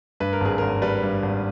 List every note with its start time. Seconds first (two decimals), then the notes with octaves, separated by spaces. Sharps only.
0.20 G2 B4
0.33 A#4
0.41 G#1 G#4
0.58 A#4
0.62 G#1
0.82 G3 B4
1.03 G2
1.23 G#1